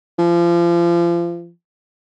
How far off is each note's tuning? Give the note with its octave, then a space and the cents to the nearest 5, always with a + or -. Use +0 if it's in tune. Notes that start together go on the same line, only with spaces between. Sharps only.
F3 -30